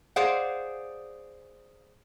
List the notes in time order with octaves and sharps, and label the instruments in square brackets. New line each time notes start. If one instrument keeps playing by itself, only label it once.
[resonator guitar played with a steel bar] G#4 C5 D5 F5 F#5